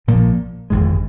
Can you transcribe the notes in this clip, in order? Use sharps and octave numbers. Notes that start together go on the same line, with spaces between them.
A#1 A#2 F3 A#3
G1 F2 D#3 G#3